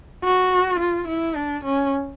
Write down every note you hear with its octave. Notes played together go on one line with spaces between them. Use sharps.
F#4
F4
E4
D4
C#4